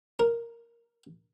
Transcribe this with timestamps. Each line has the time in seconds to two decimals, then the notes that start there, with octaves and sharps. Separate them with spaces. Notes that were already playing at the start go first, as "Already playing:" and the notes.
0.19 A#4